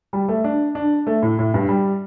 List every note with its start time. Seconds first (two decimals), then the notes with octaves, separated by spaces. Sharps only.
0.13 G3
0.28 A3
0.44 D4
0.75 D4
1.07 A3
1.23 A2
1.39 A2
1.54 G2
1.69 G3